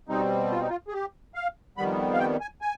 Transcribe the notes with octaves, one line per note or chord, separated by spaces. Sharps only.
B2 G3 C4 D#4
F4
D#4
F4
G#4
G4
F5
F2 D#3 G3 B3 B5
F5
G5
G#5
G#5